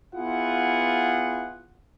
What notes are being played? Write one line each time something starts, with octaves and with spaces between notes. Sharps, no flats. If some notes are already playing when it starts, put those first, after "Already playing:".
B3 E4 F4 G#4 F#5